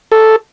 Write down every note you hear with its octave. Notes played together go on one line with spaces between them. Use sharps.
A4